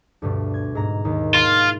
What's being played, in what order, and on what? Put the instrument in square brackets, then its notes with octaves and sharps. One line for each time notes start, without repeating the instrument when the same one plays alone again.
[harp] D2 G2 B2
G#6
G#2 A#5
D#2 D#3
[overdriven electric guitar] F4 [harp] E7